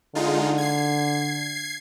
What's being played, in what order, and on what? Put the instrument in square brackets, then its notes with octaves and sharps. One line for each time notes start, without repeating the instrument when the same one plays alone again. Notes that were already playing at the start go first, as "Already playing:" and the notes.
[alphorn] D3 [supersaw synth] G#3 D#4 F4
[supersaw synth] G#6 C7